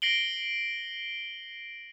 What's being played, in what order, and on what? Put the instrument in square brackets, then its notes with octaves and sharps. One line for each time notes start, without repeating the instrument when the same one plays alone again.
[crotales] A#6 C7 D7 F#7 G7